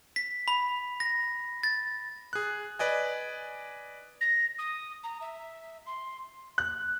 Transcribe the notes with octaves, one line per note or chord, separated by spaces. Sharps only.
B6
B5
A#6
A6
G#4 F#6
B4 D5 D#5 G#5
A#6
D#6
A#5
E5
C6
F#6